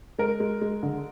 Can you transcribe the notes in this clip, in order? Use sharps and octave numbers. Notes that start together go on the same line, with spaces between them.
G#3 A#4
G#3
G#3
D3